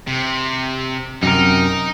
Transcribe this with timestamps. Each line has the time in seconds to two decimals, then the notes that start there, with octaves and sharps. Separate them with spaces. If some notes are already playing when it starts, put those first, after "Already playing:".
0.07 C3
1.23 F#2 C3 D#4 A#4